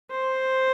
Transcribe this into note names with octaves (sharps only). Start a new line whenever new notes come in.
C5